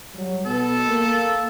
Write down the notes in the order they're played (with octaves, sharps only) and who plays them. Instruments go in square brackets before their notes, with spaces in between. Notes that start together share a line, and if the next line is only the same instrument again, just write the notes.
[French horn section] F#3 G3
[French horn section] B2 B3 [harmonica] A4
[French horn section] A#3